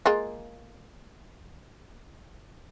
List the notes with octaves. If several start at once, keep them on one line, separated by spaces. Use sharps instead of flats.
G#3 A#3 F4